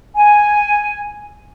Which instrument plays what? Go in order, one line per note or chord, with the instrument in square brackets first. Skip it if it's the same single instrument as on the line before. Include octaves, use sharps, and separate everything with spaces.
[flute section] G#5